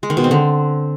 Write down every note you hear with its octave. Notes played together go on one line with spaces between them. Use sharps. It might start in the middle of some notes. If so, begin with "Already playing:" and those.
G#3
D#3
B2
C4
D3